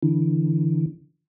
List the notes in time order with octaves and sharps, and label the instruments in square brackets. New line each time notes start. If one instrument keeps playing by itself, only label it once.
[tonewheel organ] D3 E3